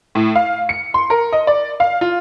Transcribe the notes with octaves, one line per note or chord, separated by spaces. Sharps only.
A2
F5
C#7
C6
A#4
D#5
D5
F5
F4